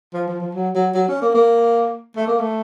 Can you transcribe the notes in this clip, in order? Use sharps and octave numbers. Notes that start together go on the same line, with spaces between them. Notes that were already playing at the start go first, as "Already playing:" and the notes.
F3
F3
F3
F#3
F#3
F#3
C#4
A#3
A#3
A3
A#3
A3